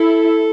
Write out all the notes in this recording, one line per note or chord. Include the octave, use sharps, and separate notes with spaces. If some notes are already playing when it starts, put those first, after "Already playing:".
Already playing: E4 A4